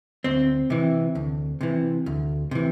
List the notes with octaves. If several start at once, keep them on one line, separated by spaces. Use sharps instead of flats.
D2 C4
C3 E3
D2
C3 E3
D2
C3 E3